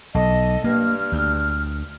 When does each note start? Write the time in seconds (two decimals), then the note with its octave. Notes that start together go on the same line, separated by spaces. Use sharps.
0.15 B1 A4 D#5
0.64 G2 A#3 F6
1.12 D2